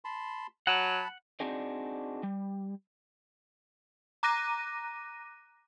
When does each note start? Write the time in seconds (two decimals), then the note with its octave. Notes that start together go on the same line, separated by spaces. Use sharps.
0.05 A5 B5 C6
0.67 F#3 F#5 A5 B5
1.40 C4 D4 D#4 F#4 G#4 D5
2.23 G3
4.23 A#5 D6 F#6 A#6 D#7